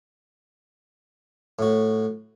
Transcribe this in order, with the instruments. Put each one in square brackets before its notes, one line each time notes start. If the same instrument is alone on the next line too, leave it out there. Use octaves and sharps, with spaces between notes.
[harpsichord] A2 F#4